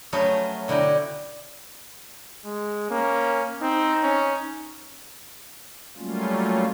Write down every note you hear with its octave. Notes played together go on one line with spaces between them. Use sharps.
F3 F#3 A3 C#4 G#4 B4
B2 D3 E4 G5 A#5
G#3
A#3 C#4
C4 D#4
C#4
F#3 G3 A3 A#3 C#4 F4